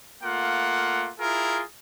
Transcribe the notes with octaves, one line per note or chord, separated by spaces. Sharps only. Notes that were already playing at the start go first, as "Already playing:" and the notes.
A3 A#3 F4 F#5
E4 F4 G#4 A#4